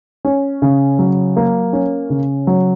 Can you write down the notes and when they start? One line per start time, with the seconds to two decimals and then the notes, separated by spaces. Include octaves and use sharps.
0.25 C#4
0.62 C#3
0.99 F#3
1.37 A#3
1.73 C#4
2.10 C#3
2.47 F#3